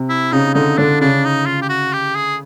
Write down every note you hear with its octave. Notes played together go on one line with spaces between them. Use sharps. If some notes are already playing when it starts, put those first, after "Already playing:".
Already playing: C3
E4
C#3 D#4
D3 D#4
D3 D4
C#3 D4
D#4
F4
G4
F#4
G4
G#4